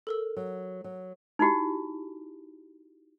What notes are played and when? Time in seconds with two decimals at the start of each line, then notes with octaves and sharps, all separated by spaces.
0.07 A4 A#4 E6
0.36 F#3
0.84 F#3
1.39 D#4 E4 F#4 G4